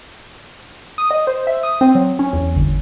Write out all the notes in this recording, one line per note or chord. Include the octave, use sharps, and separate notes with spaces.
D#6
D#5
C5
E5
D#6
C4
F#3
C#4
E2
G1